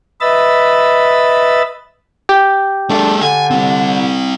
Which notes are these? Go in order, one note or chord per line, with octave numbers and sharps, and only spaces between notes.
B4 D#5 E5 B5 E6 A6
G4
G#3 D4 A4
D3 G#5
G3 C4